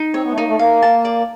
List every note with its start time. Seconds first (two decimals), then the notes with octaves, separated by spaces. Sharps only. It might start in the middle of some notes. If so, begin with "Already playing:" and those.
Already playing: D#4
0.14 C4 C#5
0.25 B3
0.32 A3
0.36 A#3 D#4
0.48 A3
0.59 A#3 F5
0.82 A5
1.05 D5